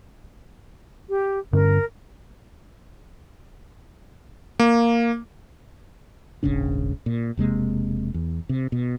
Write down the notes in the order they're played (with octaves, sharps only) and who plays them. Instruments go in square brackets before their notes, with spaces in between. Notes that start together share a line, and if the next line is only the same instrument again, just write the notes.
[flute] G4
[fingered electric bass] G2 D3 C#4 [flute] A#4
[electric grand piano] A#3
[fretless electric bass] D#1 G#1 C#3 D4
A#2
E1 C3 G#3 A#3
E2
C3
B2